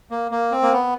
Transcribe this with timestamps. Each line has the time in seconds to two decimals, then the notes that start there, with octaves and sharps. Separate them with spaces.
0.11 A#3
0.31 A#3
0.52 C4
0.62 A#3
0.72 B3